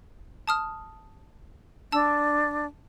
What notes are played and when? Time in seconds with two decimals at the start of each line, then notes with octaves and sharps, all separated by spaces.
0.48 A5 D#6 F6
1.92 D4 A5 E6